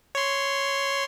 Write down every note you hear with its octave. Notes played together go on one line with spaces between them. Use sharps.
C#5 C6